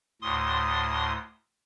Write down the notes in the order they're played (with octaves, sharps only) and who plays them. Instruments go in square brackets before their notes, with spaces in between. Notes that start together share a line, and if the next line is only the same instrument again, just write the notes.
[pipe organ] D2 A2 C6 D#6